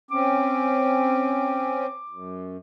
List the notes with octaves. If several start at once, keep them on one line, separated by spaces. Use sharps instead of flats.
C4 C#4 D6
F#2